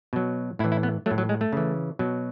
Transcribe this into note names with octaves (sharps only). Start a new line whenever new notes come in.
B2 F#3
A2 E3 E4
E4
B3
F#3 A3
A2
F#3
G#3
A3
C#3 E3
B2 F#3